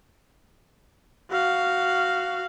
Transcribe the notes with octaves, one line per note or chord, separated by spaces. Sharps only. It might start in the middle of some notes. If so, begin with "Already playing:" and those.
F#4 F5